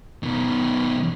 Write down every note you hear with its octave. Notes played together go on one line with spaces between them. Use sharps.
B2 D#3